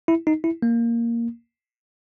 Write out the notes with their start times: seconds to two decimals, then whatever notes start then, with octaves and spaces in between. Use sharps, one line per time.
0.08 E4
0.27 D#4
0.44 E4
0.62 A#3